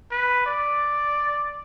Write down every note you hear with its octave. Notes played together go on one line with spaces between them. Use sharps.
B4
D5